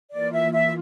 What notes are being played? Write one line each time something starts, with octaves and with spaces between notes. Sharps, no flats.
E3 A#3 F4 D5
E5
E5